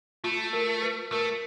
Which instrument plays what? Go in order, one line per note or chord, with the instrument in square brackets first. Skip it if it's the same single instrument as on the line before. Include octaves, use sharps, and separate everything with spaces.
[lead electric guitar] A3 [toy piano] F4
[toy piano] A#4
B4
[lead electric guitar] A3 [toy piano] A#4